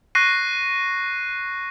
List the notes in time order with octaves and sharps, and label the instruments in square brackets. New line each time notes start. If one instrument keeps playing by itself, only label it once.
[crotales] C#6 F#6 A#6 C7 D#7